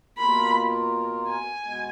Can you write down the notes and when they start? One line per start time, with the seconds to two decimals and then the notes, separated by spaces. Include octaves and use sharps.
0.18 B2 A#3 F4 A#4 B5
1.29 G#5
1.65 B2 G#3 B3